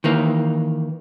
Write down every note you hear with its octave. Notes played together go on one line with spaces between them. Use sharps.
D#3 E3 A#3